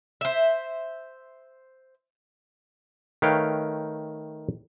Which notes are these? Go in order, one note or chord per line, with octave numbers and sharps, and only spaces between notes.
C5 E5
D#3 A3 B4 C#5 F5 G5